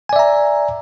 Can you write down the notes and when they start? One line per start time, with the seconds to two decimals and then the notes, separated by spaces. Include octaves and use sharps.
0.09 G#5
0.13 D5
0.16 E5
0.19 A#5